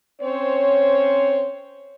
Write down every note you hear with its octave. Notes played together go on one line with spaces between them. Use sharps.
C4 C#4 C5 C#5